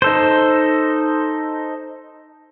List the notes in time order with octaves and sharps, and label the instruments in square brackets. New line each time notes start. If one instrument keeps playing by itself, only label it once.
[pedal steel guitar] D#4 A4 C5